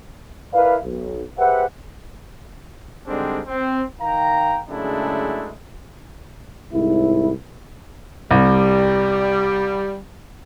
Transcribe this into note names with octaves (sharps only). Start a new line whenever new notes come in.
E4 A#4 B4 D5 F5
B1
G4 G#4 B4 C5 E5 F#5
G#2 D3 G3 G#3 C4 D4
C4
D#3 F5 G5 A#5
F#2 C#3 G#3 A3 D4 E4
C2 G#2 E4
C2 G3